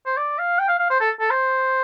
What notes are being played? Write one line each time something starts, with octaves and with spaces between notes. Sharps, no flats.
C5
D5
F5
G5
F5
F5
C5
A4
A4
C5